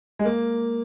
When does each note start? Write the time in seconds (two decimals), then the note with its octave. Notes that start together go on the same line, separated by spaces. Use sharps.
0.19 G#3
0.25 A#3